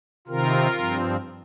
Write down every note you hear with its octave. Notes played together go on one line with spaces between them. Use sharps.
C3 D#3 C4 F4 A#4
G2 F3 C4